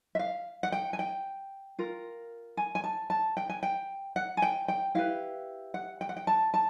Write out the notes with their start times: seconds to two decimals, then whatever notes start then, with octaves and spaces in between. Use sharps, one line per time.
0.15 E5
0.19 F5
0.63 F#5
0.72 G5
0.93 G#5
0.99 G5
1.79 F4 A#4
2.57 G#5
2.75 G#5
2.84 A5
3.10 A5
3.37 G5
3.49 G#5
3.63 G5
4.16 F#5
4.37 G#5
4.42 G5
4.68 G5
4.95 E4 G4 B4 F5
5.74 F#5
6.01 G5
6.09 F#5
6.17 G5
6.27 A5
6.54 A5